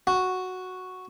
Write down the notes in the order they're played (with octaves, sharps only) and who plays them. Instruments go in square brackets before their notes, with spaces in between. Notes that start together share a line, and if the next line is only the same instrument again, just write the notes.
[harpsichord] F#4